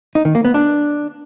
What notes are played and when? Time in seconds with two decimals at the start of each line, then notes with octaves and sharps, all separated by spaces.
0.15 D#4
0.25 D#3
0.35 A#3
0.45 B3
0.54 D4